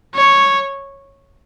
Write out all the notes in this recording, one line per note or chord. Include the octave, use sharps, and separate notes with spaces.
C#5